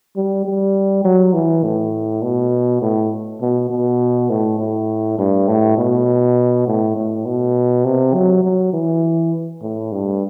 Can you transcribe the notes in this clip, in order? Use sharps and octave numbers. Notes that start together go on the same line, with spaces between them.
G3
G3
F#3
E3
A2
B2
A2
B2
B2
A2
A2
G2
A2
B2
A2
A2
B2
C3
F#3
F#3
E3
A2
G2